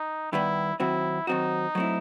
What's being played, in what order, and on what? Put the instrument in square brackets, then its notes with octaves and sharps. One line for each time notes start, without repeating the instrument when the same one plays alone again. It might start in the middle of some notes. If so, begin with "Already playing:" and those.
Already playing: [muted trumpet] D#4
[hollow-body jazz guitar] D#3 G3 B3 [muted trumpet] E4
[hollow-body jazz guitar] D#3 F#3 C4 F#4 [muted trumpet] E4
[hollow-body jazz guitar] D#3 F#3 C4 F#4 [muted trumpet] D#4
[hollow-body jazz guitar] F#3 A3 C4 E4